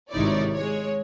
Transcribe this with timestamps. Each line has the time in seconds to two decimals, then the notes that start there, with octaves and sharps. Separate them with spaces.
0.11 G#1 C3 D#4 E4 C#5 D5
0.56 G#3 C#5